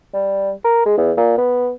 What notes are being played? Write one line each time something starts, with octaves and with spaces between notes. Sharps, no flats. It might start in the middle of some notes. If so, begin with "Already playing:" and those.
G3
A#4
G#3
E2
A#2
B3